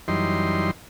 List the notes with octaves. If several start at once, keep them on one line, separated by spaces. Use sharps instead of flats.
F#2 E3 G3 D#4 C6